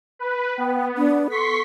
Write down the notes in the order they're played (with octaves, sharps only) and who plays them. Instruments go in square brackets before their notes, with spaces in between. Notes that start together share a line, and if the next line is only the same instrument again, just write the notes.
[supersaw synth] B4
[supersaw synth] B3 [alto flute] G5
[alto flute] D4
[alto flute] A4 [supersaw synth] C6 C#6 B6